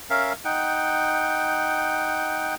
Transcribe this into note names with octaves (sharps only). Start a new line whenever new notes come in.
C#4 A#4 E5 F5
D#4 F#5 G5